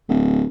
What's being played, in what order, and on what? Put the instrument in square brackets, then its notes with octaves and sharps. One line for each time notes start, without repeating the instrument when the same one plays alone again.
[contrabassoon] D1